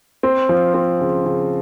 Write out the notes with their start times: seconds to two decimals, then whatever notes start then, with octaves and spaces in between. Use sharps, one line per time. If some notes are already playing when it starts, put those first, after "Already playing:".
0.23 C4
0.49 F3
0.74 C4
1.01 C#3
1.25 C#3